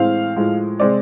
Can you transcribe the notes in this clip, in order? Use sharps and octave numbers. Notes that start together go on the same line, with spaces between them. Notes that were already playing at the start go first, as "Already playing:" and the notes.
Already playing: A2 E3 G#3 C4 F5
A2 F3 G#3
C3 G#3 C4 D5